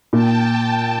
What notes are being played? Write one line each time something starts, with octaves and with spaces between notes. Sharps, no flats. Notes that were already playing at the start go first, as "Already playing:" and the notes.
A#2 G5 A5